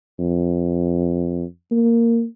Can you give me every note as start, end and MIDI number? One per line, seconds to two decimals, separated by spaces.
0.19 1.45 41
1.71 2.25 58